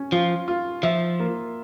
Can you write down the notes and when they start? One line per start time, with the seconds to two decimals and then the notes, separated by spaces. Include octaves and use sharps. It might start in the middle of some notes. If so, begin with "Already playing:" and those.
Already playing: C#4
0.12 F3 F4
0.48 F4
0.83 F3 E5
1.20 A#3